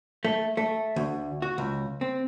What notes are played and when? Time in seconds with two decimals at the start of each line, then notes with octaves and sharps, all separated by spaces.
0.25 A3
0.57 A3
0.96 D2
1.42 F#4
1.58 C#2
2.01 C4